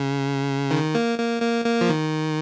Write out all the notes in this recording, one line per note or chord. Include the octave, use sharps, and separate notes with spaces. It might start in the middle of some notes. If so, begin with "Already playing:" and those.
Already playing: C#3
D#3
A#3
A#3
A#3
A#3
F3
D#3